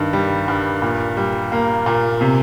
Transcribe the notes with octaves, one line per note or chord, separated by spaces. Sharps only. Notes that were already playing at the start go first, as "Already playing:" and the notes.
Already playing: G2 D#3
G3
G2
A#2
G3
A#3
A#2
C3